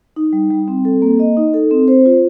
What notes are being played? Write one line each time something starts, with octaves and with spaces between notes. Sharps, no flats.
D#4
G3
G3
C4
A4
A#3
D#5
D#4
A4
C4
C5
F4